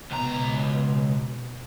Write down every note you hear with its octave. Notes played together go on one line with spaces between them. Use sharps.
C#2 B2 A#5